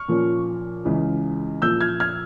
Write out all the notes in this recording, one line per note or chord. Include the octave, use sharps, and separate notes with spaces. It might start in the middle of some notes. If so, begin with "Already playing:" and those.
Already playing: C#6 F6
A#2 F3 A#3 C#4
C#2 C#3 E3
A#2 F3 A#3 E6 G6
F6 G#6
F6 G#6